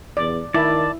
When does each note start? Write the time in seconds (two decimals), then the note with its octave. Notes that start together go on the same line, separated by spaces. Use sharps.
0.17 E2 D5
0.54 D#3 E4 D5 A5